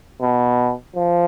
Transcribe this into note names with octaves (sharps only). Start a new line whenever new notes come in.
B2
F3